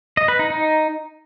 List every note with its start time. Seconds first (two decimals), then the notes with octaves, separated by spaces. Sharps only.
0.17 D#5
0.28 B4
0.39 D#4
0.50 D#4